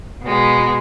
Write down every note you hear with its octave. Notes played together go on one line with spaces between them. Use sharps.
B2 G#3